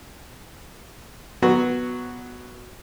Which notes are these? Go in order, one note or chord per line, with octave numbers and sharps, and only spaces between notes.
F#3 B3 F#4